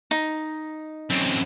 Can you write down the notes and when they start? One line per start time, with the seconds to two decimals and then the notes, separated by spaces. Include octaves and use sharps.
0.11 D#4
1.10 F#2 C4